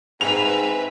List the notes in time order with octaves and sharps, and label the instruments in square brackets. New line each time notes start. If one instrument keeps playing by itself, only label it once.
[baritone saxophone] G#2 [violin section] C4 B4 E5 [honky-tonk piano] F7